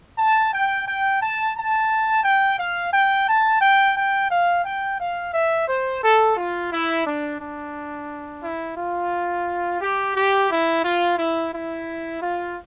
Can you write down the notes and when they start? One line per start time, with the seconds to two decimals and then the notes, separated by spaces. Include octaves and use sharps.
0.17 A5
0.52 G5
0.86 G5
1.20 A5
1.55 A5
2.24 G5
2.58 F5
2.92 G5
3.27 A5
3.61 G5
3.95 G5
4.29 F5
4.65 G5
4.99 F5
5.33 E5
5.67 C5
6.02 A4
6.37 F4
6.71 E4
7.06 D4
7.40 D4
8.43 E4
8.77 F4
9.80 G4
10.15 G4
10.49 E4
10.84 F4
11.17 E4
11.53 E4
12.21 F4